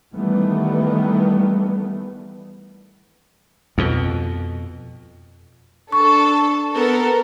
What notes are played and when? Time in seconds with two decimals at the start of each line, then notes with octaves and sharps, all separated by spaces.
0.14 D#3 E3 G3 A3 B3
3.78 F2 B2
5.92 D4 A4 A5 C#6
6.74 B3 A4 A#4